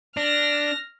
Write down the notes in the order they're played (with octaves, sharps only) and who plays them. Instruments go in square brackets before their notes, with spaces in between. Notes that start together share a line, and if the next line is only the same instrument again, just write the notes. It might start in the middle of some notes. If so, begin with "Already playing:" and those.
[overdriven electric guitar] D4 [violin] F6 A#6